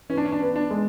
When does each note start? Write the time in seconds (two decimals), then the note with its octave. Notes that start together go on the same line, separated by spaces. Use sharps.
0.10 E3 C#4
0.17 D4
0.25 C#4
0.32 D4
0.41 B3
0.56 D4
0.70 G#3